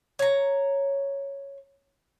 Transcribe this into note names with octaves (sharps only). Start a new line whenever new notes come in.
C#5 A#5